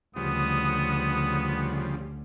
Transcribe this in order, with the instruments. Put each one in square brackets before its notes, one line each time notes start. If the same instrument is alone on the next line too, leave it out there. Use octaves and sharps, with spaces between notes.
[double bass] D2 [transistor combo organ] C#3 F3 G3 [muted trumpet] B3 [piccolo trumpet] D#6